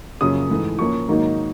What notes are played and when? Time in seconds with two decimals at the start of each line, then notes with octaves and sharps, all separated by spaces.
0.21 F#2 C#3 F3 A#3 C#4 D#6
0.50 G#2 E3 A3
0.79 A#2 F3 A#3 C#4 C#6
1.08 G#2 D#3 F#3 A#3 D#4